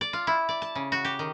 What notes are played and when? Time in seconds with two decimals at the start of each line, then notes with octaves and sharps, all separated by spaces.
0.01 D5
0.13 F4
0.27 E4
0.49 D5
0.62 A5
0.75 C#3
0.92 F#4
1.05 G4
1.19 D#3